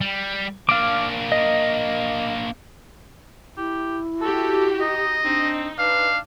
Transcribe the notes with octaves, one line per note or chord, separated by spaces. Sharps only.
G3
A#3 D4 F5 D6
D#5
E4 G4
F#4 G4 A4
D#4 D#5
C4 D4 D#4
D4 B4 F5